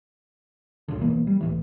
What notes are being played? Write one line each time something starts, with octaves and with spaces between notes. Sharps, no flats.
C2 F#2 A#2 D3
D#1 B2 E3 A#3
G3
C2 A2 E3